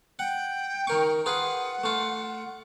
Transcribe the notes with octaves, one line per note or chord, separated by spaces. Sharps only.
F#5 G5
D#3 A#4 C#6
F4 G#4 B4 F#5
A3 F4